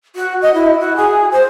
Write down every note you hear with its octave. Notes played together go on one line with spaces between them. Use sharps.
F#4
D#5
E4
F#4
G#4
C5